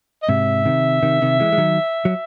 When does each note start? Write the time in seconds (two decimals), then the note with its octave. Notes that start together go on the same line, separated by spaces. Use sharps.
0.23 D#5
0.29 G#2 C3 E5
0.65 C3 D#3
1.03 C3 D#3
1.22 C3 D#3
1.40 E3 G#3
1.52 G#3
1.58 D#3 F#3
2.05 F#3